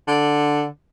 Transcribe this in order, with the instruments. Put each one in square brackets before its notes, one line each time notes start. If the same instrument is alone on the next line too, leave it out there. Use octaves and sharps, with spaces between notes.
[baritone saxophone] D3